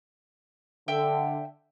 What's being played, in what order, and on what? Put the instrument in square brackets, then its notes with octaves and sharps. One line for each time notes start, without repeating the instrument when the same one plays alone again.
[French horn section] D3 [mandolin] E5 G5 E6